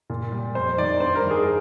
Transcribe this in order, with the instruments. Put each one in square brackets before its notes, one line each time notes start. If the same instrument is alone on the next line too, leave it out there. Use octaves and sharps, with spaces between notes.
[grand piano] A#2
G3
F2 C5
D#3 G3 D5
G2 C5
A#4
D#3 G3
G#4